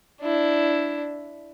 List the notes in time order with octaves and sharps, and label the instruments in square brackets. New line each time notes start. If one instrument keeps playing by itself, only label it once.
[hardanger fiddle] D4 E4